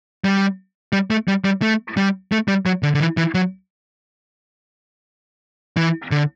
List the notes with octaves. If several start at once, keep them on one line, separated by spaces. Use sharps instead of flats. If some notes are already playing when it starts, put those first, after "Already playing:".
G3
G3
A3
G3
G3
A3
G3
A3
G3
F#3
D3
D3
E3
E3
F#3
E3
D3